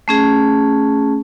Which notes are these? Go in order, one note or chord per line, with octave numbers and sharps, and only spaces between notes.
A3 C#4 G#4